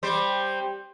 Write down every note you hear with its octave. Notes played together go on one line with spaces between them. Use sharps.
G3 C4 C5